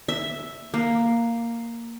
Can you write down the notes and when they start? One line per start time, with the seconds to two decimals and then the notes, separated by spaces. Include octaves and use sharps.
0.08 E5
0.74 A#3